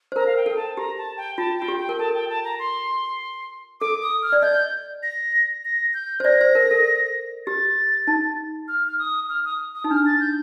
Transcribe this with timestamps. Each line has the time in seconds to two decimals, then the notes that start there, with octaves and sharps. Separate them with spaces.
0.12 C5
0.16 A#4 A#5
0.27 F5
0.37 G5
0.46 A4
0.56 A5
0.77 G4 A#5
0.98 A5
1.17 G5
1.37 F4 A5
1.58 F4 G5
1.68 G4
1.78 G5
1.89 A#4
1.99 A4 A5
2.14 G5
2.29 A5
2.44 A#5
2.59 C6
3.81 A4 D6
4.02 D#6
4.23 F6
4.32 D5
4.42 D#5 G6
5.03 A#6
5.65 A#6
5.94 G6
6.20 C5
6.24 D5 A#6
6.41 C5
6.55 A#4
6.71 A4
7.46 G4 A6
8.08 D#4
8.68 F6
8.87 F6
8.99 D#6
9.29 F6
9.45 D#6
9.75 D#6
9.84 D#4
9.90 D4 F6
10.06 A6
10.20 G6